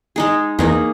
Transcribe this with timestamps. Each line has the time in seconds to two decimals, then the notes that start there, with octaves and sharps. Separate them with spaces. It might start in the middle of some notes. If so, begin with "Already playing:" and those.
0.16 G#3 D#4 G#4
0.59 E2 A#3 D#4 G#4